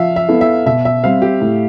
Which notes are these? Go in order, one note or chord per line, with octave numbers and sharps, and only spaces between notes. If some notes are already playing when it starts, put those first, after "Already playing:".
Already playing: F3 E5 F5
E5
B3 E4 A4
E5
B2 E5
E5
G3 C4 F5
G4
A2